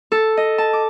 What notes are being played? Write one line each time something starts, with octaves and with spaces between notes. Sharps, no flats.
A4
D#5
A5
D6